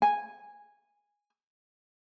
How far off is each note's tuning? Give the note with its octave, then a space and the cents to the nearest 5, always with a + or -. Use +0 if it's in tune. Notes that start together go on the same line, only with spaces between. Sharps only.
G#5 -10